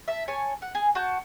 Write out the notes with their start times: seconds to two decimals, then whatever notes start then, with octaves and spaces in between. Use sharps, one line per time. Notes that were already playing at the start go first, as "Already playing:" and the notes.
0.08 E5 A5
0.28 C#5 G#5 A5
0.62 F#5
0.75 G#4
0.95 F#4 A5 G6